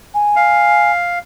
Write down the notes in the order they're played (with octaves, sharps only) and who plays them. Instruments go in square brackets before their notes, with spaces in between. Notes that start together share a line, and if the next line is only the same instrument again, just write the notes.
[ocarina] G#5
[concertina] F5